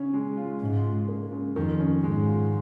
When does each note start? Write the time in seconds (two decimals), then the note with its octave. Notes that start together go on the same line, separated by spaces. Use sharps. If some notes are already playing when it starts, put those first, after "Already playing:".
Already playing: C#3 C#4
0.14 G#3
0.37 F4
0.61 G#2 C#3
0.84 F4
1.09 A#3
1.32 C#3
1.56 F2 D#3
1.79 C#4
2.03 G#2 G#3
2.26 F4